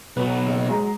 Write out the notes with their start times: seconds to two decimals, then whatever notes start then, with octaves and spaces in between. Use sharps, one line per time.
0.17 B1 F#3 B4
0.46 F#1
0.67 F#3 G#3 A#5